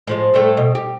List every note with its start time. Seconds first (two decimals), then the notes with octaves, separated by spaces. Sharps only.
0.07 A2 F3 G#3
0.34 A2 G3 A3
0.57 B2
0.75 G4